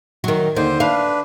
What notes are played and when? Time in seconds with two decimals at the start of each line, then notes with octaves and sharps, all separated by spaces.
0.24 D#3 F#3
0.56 D#2 D3 C5
0.80 D4 B4 F5